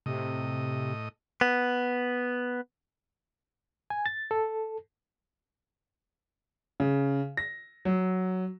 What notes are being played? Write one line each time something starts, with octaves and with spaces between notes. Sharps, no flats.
A2 C3 D#5
B3
G#5
A6
A4
C#3
A#6
F#3